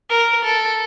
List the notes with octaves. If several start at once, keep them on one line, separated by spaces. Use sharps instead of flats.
A#4
A4